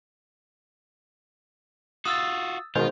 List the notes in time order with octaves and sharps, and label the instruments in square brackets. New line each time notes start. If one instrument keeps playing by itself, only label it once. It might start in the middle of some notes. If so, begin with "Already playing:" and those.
[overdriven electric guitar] F4 F#4 [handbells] D#6 E6 A6
[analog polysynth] B2 D#3 G#3 [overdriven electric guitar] F4 [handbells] C5